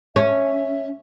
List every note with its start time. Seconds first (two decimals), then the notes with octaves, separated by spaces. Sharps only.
0.16 C#4 E5